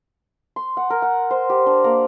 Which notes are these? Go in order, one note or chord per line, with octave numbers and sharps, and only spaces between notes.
C6
F#5
A#4
F#5
C5
G4
D4
A#3